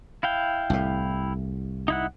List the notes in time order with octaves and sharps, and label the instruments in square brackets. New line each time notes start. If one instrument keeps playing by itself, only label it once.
[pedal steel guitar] E4 F5 G5
[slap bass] C2 A2
[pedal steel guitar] D#4 E4 F#5